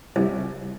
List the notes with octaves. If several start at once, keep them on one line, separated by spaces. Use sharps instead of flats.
C2